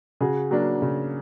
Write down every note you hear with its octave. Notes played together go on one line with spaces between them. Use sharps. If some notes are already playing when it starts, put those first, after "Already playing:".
C#3 F#4 G#4
F#3 A#3 D4
C#3